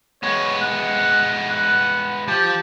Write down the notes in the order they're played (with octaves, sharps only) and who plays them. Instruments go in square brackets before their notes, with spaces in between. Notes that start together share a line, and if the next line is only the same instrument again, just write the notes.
[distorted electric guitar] G#3 B3 [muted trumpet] C#5
[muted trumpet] F#5
F#5
[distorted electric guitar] F3 A5 [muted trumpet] G4